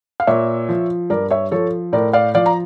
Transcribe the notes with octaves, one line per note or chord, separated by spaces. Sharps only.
F5
A#2 C#5 E5
F3
G2 A#4 D5
C#5 E5
F3 A4 C#5
A2 A#4 D5
D5 F5
F3 D5 F5
A#5